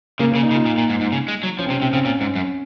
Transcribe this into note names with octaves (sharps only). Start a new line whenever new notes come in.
C#3 A#3
A#3
C#3
D#4
C#3
F4
A#2
A#2
G#2
G#2
C#3
G#3
F#3
F3 C#4
C4
C3 C#4
C3 C4
C#3 C4
A#2 C#4
G#2
F#2